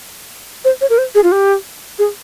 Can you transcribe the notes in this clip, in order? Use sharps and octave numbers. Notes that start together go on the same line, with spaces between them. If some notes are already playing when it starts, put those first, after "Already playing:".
C5
C#5
A#4
C5
G#4
F4
G4
G#4